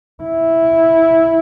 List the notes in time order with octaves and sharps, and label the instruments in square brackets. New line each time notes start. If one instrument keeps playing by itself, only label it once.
[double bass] E4